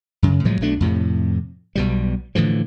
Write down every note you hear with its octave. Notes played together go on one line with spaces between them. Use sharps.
F#2 C#3
A2 F3 F#3 G#3
B1 B2 A3 D4
F2 A2 C3
B1 B2 G3
A2 D3 E3 F3